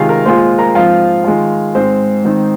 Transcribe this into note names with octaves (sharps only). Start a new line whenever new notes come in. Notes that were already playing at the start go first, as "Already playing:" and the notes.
Already playing: C3 D#3 G#3 F4 G#4 F5 G#5
A#4 A#5
A#2 G#3 F4 C5 C6
A#4 A#5
G#2 F3 C4 F4 F5
D#3 G#3 F4
G#2 G#3 C4 C5
G#2 D#3 C4 D#4